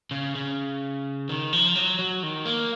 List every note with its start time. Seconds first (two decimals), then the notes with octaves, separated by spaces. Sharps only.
0.11 C#3
0.35 C#3
1.29 D#3
1.53 F3
1.75 F#3
1.99 F#3
2.23 D#3
2.46 A#3